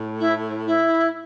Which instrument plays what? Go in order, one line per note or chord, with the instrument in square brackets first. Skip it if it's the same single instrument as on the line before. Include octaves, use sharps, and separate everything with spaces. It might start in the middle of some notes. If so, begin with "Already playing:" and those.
Already playing: [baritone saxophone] A2
[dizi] E4
E4